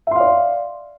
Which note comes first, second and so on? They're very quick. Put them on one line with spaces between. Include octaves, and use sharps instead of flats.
E5 C6 F5 D5